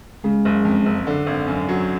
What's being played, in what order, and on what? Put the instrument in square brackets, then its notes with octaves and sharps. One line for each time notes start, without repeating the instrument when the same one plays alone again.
[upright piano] C#3 [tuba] G#3
[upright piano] F#1
F2
F#1
D3
G#1
F#2
F#3